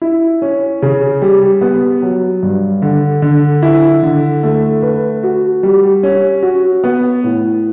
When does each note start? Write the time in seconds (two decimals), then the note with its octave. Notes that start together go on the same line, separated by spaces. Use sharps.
0.02 E4
0.42 C#4
0.82 C#3
1.22 G3
1.61 B3
2.02 F#3
2.43 G2
2.82 D3
3.22 D3
3.62 E4
4.03 D3
4.43 A3
4.82 B4
5.23 F#4
5.63 G3
6.03 C#4
6.43 F#4
6.84 B3
7.24 A2